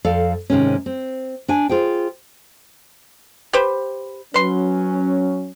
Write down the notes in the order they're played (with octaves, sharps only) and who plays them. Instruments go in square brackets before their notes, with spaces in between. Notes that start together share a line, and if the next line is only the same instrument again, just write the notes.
[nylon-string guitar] F2 A4 D5 F5
G#2 C3 D#3 G#3 C#4
C4
D4 G#5
F4 G#4 C5 G5
[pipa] G4 B4 C5
[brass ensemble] F#3 C#4 [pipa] B4 C6